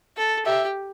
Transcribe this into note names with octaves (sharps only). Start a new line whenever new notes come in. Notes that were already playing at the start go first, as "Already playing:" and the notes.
A4
G4 E5